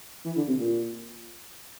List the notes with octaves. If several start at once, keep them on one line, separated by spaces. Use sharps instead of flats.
E3
D3
C3
A#2